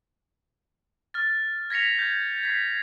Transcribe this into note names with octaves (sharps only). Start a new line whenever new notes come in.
F6 A6
G#6 A#6 B6 C#7 F7
G6
G#6 B6 C7